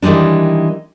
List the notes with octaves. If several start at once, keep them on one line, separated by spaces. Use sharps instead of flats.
D#3 E3 G3 G#3 D4